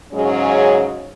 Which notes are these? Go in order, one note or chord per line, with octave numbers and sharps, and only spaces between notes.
G#2 C#3 F#3 C#4 G#4